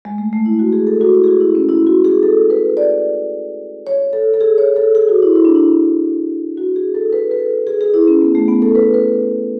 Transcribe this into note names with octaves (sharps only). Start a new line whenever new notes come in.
G#3
A3
A3
E4
F#4
G#4
A4
F#4
E4
G#4
F#4
E4
C#4
E4
F#4
G#4
A4
B4
D5
C#5
A4
A4
G#4
C#5
A4
G#4
F#4
E4
E4
D4
E4
F#4
G#4
A4
B4
B4
A4
G#4
G#4
E4
C#4
B3
A3
B3
A4
B4
B4